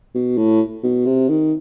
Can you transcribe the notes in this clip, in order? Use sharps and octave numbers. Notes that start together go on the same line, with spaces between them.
B2
A2
B2
C3
D#3